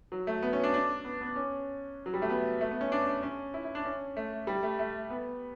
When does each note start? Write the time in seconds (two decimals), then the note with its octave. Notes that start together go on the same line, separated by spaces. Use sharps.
0.12 F#3
0.27 A3
0.42 B3
0.53 C#4
0.63 D4
0.74 D4
1.05 B3
1.21 B3
1.36 C#4
2.06 F#3
2.14 G3
2.22 A3
2.30 B3
2.61 A3
2.71 B3
2.81 C#4
2.92 D4
3.07 D4
3.23 C#4
3.54 E4
3.65 E4
3.75 D4
3.85 C#4
4.17 A3
4.47 G3
4.63 A3
4.79 A3
5.10 B3